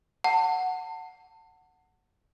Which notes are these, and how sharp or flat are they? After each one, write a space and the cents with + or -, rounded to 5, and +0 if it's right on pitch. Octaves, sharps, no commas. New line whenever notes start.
F#5 +0 A5 +30